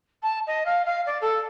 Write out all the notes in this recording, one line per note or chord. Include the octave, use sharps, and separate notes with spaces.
A5
D#5
F5
F5
D5
A4